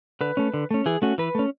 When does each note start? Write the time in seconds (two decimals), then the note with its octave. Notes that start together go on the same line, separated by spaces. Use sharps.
0.21 D3 B4
0.37 A3 C#4
0.54 D3
0.71 A3 C#4
0.86 E3 G#4
1.02 A3 C#4 F#4
1.18 E3 B4
1.35 A3 C#4